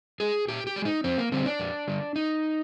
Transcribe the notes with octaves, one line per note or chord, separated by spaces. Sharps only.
G#3 G#4
A#2 G4
G4
G#3
D#4
F2 C4
A#3
D3 G3 C4
D4
F2
D3 G3
D#4